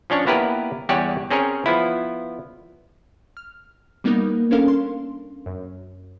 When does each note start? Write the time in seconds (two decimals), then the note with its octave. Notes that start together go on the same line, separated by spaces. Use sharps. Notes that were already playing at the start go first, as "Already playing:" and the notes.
0.10 F3 C#4 D4 C#5
0.26 A#3 B3 E4 G4 A#4 B4
0.89 E2 G3 G4 C#5 F#5 G#5
1.30 C4 C#4 G#4 A#4 C#5
1.66 F3 B3 E4
3.37 F6
4.04 G3 A#3 B3 D#4 A#4
4.51 C#4 D4 A4 A#4 F5
4.68 C6
5.46 F#2